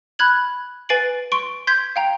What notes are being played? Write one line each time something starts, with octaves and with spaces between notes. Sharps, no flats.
B5 F6 F#6 G#6 F#7
B4 G#5 A6 C7 D7 F#7
C6 C#6 D7
C6 G6 G#6 B6
F5 G5 A#5